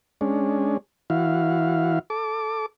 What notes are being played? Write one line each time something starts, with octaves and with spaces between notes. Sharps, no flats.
G#3 C#4 D4
E3 E4 F#4 F5
A4 D6